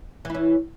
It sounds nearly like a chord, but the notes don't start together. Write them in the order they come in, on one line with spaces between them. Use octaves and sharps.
E3 E4 C#4